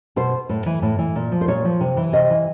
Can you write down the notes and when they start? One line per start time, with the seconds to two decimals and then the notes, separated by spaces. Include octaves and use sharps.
0.16 B2 C5
0.49 A2
0.66 E3
0.82 A2
0.99 E3
1.16 A#2
1.31 F3
1.41 C5
1.48 A#2 C#5
1.65 F3
1.81 C3
1.97 E3
2.13 C3 D#5
2.30 E3